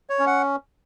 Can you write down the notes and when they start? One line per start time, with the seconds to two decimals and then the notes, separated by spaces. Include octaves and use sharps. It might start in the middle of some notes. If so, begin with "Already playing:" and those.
0.10 C#5
0.19 C#4
0.27 F#5